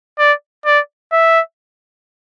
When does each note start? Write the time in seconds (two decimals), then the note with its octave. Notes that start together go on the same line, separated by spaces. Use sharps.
0.19 D5
0.65 D5
1.12 E5